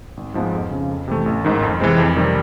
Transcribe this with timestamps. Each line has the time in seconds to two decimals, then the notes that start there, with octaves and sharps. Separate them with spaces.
0.17 G#1
0.34 G#2 F3 G#3 B3
0.53 F2
0.70 C#3 F3
0.89 F2
1.08 C3 E3 A3
1.26 A1
1.45 G#2 D#3
1.62 F2
1.80 C3 E3 G#3 C4
1.98 F2
2.16 C3 D#3 G3